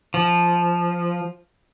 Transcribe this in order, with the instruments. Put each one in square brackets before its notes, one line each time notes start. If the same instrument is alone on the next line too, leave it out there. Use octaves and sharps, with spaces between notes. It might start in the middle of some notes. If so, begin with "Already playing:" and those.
[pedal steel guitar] F3